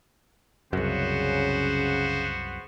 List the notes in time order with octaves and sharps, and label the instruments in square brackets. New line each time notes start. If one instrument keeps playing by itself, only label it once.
[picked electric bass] C2 F#2 [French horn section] C#3 [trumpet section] B3 F#4 C5